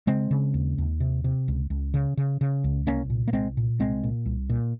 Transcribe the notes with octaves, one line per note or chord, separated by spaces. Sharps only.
C#3 G#3 C4
C#3
D#2
D#2
C3
C3
C#2
C#2
C#3
C#3
C#3
C#2
C2 A#3 C#4
A#2
A#3
C2 G#3 C4
A#2
C2 G#3 C4
A#2
C2
A#2